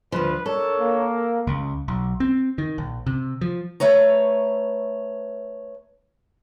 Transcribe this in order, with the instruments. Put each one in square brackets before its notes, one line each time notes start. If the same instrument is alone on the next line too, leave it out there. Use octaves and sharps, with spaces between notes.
[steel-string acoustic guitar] D2 F3 [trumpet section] B4
[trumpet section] D4 A#4 C#5 [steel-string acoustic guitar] A4
[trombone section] A#3
[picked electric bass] C#2
B1
C4
D#3
A#1
C3
F3
[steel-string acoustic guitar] A3 B4 C#5 A#5